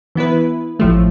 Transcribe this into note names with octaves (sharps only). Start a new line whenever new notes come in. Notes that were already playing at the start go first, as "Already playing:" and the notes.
E3 B3 E4 B4
A1 A2 F3 A3